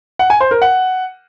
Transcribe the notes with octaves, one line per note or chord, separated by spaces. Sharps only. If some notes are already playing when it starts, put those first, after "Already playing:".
F#5
G#5
C5
A#4
F#5